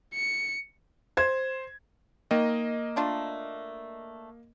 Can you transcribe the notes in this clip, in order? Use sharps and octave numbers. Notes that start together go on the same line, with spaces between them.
C#7
C5 G#6
D#3 A#3 D#5
A3 D4 F4